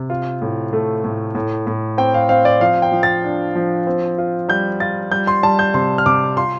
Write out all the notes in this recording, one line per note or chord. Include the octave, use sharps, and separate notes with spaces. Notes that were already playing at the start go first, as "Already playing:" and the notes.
Already playing: C3
F4
A2
A3
A2
A2
A2
C4 G5
F5
C4 F5
D5
F3 F5
G5
F3
A6
D4
F3
C4
F4
G3 G6
F4 A6
G3 G6
C6
G3 A5
G6
C3 C6
F6
C3 D6
F4 C6